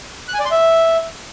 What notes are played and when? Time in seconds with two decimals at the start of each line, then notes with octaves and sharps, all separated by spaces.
0.28 F#6
0.34 G#5
0.40 D5
0.45 C6
0.51 E5